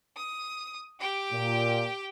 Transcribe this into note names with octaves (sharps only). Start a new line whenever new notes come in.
D#6
G4 G5
A#2